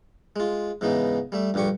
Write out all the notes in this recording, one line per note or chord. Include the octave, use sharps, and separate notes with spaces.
G#3 F4
G#2 C#3 E3 B3 D#4
G3 A3 E5
A#1 G2 D3 G4 C#6